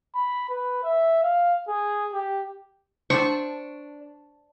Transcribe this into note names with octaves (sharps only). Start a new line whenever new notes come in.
B5
B4
E5
F5
G#4
G4
D4 C5 A5 C#6